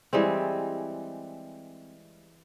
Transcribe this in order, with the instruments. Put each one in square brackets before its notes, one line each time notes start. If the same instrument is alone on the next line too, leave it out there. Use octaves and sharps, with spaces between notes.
[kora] E3 G3 G#3 C4